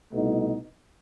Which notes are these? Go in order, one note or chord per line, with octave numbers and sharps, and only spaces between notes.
C2 B2 A3 D#4